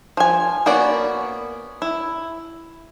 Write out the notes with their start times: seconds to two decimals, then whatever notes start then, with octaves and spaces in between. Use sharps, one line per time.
0.17 F3 G#5
0.66 A#3 B3 C#4 F#4 D5
1.82 E4